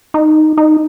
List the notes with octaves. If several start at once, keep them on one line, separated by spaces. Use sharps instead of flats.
D#4
D#4